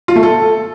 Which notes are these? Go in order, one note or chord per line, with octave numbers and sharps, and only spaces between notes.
F4
A3
A4